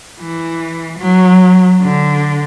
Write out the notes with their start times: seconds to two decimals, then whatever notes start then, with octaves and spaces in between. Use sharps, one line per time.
0.20 E3
0.98 F#3
1.82 D3